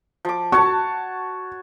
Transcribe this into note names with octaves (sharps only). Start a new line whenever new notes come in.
F3 D6
F#4 C#5 A5 C#6